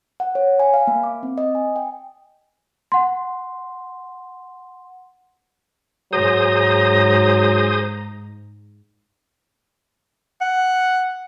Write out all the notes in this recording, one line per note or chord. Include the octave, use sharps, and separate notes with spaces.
F#5
C#5
G#5
F5
A#3
D6
C4
D#5
G#5
G5
F#5 C6
G#2 F#3 G#4 C5 A#5 D#6
F#5